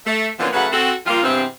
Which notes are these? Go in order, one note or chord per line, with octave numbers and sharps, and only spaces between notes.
A3
D3 E3 F3 A#3 B3 C#4
C#3 F#3 A3 B4 F#5
C4 F#4 A4
F3 G3 A#3 F4
E2 G2 C3 C4